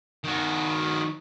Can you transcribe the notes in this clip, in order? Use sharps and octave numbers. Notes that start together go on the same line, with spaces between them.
D#3 F#4